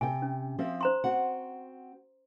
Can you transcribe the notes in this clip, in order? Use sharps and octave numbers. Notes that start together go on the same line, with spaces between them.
C3 G5 G#5
C#4
F3 C4 E5
C5 A#5 C6
C4 F#4 F#5